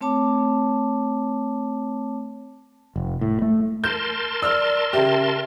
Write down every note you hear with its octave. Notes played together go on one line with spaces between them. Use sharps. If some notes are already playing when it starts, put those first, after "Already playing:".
A3 C4 C#5 A5 D6
F1
A2
A3
A#4 A5 C6 G6
D5 E6 F6
C#3 G4 E5